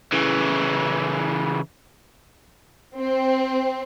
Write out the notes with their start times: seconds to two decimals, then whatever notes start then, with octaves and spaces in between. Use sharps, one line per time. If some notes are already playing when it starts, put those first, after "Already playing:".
0.12 C#3 E3
2.97 C4